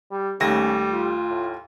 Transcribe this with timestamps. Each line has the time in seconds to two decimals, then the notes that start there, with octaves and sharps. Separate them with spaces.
0.11 G3
0.40 D#2 G3 A3 C#4 A#6
0.90 F4
1.30 A2